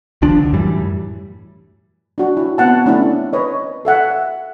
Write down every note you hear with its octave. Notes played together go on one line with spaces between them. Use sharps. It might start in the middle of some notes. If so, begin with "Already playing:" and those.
C#2 D#3 F3 D4
D3
F#2 A2 E3 G3
D4 F#4
E4
B3 C4 F#5 A5
A3 C#4 D4 E4
B4 C#5 D#5
A4 E5 F#5